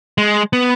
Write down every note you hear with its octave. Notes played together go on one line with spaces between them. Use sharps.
G#3
B3